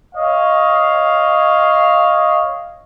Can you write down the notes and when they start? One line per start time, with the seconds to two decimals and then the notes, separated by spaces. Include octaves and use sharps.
0.15 C#5 D#5 F5